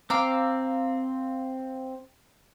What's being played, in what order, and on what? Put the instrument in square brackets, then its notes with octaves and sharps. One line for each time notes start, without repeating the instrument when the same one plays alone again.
[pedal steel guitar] C4 E6 [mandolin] F5 A#5 D6